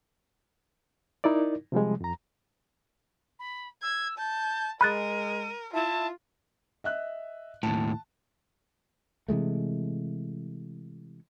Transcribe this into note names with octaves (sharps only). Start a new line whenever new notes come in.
D#4 E4 A#4 D5
C3 F3 G3 G#3
F2 A#5
B5
E6 G#6
A5 G6
G#3 A#4 B5 F#6 A6 D#7
E4 F4 A5
D#5 E5 F#6
D#2 A2 A5
C3 E3 G#3 A3